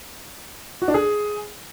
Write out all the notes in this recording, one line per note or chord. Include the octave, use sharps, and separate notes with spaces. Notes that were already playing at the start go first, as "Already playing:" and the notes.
F#4
D4
G#4